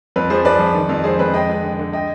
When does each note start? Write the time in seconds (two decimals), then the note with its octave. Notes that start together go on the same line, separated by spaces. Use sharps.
0.16 F2 B4
0.30 F3 G#4 C5
0.45 F3 B4 D5
0.59 F3
0.74 D#3
0.89 F2
1.04 G#3 G#4 C5
1.19 F2 B4
1.34 G#3 D#5 G5
1.49 G#3
1.63 D3
1.79 D3
1.93 D#5 G5